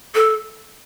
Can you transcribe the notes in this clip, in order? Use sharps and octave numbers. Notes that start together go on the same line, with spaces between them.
A4